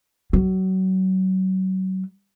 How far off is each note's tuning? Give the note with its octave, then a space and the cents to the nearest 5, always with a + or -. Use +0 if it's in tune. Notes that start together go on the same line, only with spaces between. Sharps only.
F#3 +25